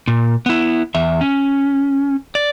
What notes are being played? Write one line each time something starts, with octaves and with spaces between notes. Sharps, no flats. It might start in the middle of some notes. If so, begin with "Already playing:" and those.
A#2
B3 E4
E2 E5
C#4
D5